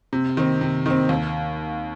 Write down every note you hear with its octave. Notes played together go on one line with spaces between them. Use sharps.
C3
D#3 C4
C3
D#3 C4
D#2